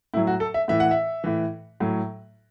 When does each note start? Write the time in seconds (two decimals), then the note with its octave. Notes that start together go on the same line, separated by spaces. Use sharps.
0.14 A2 F#3 E4
0.27 F#4
0.40 A4
0.54 E5
0.68 A2 E3 E5
0.80 F#5
0.91 E5
1.24 A2 E3
1.80 A2 F#3